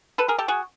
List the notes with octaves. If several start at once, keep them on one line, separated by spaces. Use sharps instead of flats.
A4 B4
G#4 A#4
G4 A4
F#4 G#4